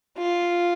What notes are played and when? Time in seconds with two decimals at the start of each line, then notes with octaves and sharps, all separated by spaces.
0.18 F4